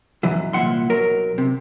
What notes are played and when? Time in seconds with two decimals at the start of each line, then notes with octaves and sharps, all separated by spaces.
0.23 F#2 B2 E3 F#3
0.53 C2 A#2 E5 F#5 C6
0.90 B1 F#3 A#4
1.38 C3